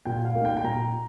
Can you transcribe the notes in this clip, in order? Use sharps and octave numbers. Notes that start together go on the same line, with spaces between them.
A#2 G5
F5
A#3 D#4
G5
G5
A#2 A#5